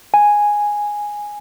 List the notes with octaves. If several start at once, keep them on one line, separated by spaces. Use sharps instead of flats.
G#5